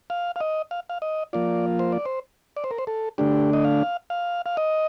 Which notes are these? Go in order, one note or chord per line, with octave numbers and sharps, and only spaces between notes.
F5
F5
D#5
F5
F5
D#5
F3 A#3 F4 D5
C5
D5
C5
D5
C5
A#4
C5
A4
D3 A3 D4 G4
D#5
F5
F5
F5
D#5